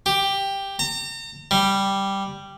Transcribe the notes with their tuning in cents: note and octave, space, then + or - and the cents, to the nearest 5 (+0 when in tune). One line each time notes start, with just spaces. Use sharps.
G4 +5
A#5 -40
G3 +0